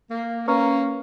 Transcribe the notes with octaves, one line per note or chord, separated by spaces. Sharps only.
A#3
A#3 C#4 B4 F5 A#5 C#6